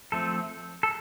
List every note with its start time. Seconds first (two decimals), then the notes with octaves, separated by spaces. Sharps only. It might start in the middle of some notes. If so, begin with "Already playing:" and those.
0.12 F3 A3 C4 A4
0.83 A4